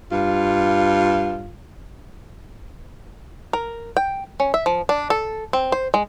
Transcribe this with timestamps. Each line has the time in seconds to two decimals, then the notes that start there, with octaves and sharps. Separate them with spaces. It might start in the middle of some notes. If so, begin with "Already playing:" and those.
0.12 G2 F4
3.53 A#4
3.97 G5
4.40 C#4
4.54 E5
4.66 F3
4.89 D4
5.10 A4
5.53 C4
5.72 C5
5.94 G#3